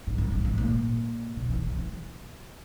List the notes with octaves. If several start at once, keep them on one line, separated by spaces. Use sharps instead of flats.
G#2
F#2
G#2
G#2
A#2
B2
E3
D#3
E3